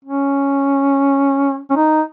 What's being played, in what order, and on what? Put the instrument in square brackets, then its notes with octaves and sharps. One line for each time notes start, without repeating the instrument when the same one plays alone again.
[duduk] C#4
C#4
D#4